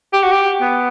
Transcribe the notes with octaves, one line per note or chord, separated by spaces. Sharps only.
G4
F#4
G4
B3